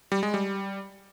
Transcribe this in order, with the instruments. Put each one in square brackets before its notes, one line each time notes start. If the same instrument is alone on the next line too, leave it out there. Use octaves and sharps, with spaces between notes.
[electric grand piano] G3
G#3
G3